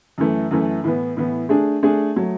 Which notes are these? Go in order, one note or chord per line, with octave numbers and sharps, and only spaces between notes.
F#2 E3 A3
F#2 E3 A3
A2 E3 B3
A2 E3 B3
A3 D4 G#4
A3 D4 G#4
F#3 A3